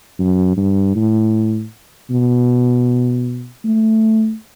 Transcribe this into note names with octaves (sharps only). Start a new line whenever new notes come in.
F#2
G2
A2
B2
A3